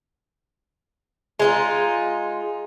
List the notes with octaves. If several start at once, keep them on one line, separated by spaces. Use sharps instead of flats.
G#3 D#4 F4